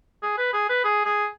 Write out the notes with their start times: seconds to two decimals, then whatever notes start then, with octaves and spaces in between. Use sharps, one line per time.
0.23 G#4
0.38 B4
0.54 G#4
0.70 B4
0.84 G#4
1.05 G#4